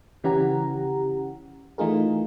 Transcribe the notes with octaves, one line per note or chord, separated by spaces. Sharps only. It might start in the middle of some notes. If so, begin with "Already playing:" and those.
C#3 E3 C#4 G4 F#5 A#5
E3 A3 D#4 F4 G#4 A#4